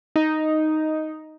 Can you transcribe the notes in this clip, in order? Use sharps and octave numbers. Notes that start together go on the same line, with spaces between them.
D#4